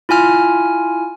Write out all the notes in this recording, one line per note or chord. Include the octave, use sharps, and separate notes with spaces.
E4 F4 G#5 F6